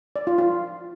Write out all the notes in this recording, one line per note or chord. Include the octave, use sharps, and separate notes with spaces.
D5
F4
F4